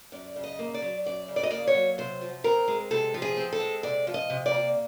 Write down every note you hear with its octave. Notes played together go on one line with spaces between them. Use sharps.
F#2 D5
C#3
D#5
A#3
D5
F#3
F#2 D5
C#3
D5
D#5
A#3 D5
C#5
F#3
C3 C5
F3
C4 A#4
G#3
C3 A4
F3
G#4
C4
A4
G#3
C3 D5
F3
D#5
C3
D5
A#3